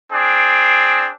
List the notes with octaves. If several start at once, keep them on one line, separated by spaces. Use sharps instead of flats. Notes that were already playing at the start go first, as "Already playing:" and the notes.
C4 D4 G#4